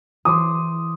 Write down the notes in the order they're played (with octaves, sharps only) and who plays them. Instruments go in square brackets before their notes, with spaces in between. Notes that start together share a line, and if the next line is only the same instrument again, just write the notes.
[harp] E3 C5 [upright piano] D6 D#6